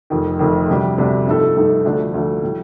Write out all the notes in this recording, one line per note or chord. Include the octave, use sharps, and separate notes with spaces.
F1 F2 D#3
F1 F2 D#3
D2 C3 G3 D4
D2 C3 G3 D4
G2 F3 A3 D#4 A4
G2 F3 A3 D#4 A4
D2 D3 F3 A3 D4
D2 D3 F3 A3 D4
A2 G3